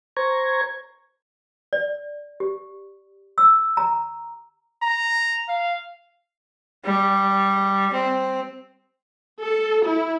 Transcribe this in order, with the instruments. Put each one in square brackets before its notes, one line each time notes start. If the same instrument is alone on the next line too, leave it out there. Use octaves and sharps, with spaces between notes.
[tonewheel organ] C5 A#5 C#6 G#6
[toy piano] D5
G4
E6
A#5
[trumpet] A#5
F5
[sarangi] G3
C4
[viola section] A4
E4